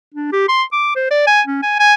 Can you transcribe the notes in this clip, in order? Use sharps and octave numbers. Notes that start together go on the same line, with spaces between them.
D4
G4
C6
D6
C5
D5
G#5
C#4
G#5
G#5